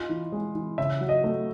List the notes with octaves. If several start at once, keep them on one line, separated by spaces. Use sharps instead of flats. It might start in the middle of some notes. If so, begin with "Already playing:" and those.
Already playing: D#4 F4
E3
G#3
E3
C#3 E5
F#3
D#5
A3